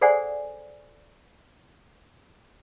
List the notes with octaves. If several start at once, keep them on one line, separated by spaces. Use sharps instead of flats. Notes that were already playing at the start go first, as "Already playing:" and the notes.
G#4 A4 C5 D5 F#5 G#5